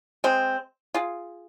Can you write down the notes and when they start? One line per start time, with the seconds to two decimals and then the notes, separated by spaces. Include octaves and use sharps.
0.24 G#3 C4
0.94 F4 G#4